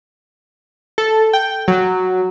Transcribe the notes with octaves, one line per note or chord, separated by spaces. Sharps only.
A4
G5
F#3